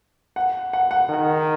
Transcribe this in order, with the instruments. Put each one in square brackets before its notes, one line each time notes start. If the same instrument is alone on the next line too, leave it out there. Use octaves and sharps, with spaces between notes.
[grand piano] F#5
F#5
F#5
[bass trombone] D#3